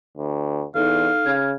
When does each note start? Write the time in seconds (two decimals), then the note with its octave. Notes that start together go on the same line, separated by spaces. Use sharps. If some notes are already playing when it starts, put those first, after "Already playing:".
0.17 D2
0.75 E2 D#4 A4 F5
1.26 C#3 F6 G#6